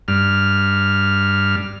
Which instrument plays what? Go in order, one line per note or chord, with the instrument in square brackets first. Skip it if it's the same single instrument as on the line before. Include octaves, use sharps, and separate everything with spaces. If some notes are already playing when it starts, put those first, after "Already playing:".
[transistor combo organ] G2 F6